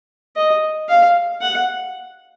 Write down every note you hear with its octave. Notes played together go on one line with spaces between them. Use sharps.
D#5
F5
F#5